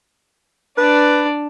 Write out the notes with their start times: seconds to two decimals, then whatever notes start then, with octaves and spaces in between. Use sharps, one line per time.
0.78 D4 B4 D5